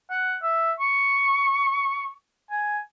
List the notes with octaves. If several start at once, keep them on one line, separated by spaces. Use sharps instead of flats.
F#5
E5
C#6
G#5